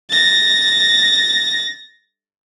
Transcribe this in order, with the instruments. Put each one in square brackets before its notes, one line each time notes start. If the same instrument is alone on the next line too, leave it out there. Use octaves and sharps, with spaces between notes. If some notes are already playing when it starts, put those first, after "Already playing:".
[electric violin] A6 A#6